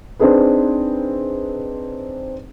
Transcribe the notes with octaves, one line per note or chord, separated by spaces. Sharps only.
C4 D4 D#4 G#4 B4